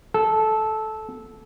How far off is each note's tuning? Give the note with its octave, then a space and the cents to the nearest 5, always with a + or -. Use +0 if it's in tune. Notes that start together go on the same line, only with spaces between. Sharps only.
A4 -15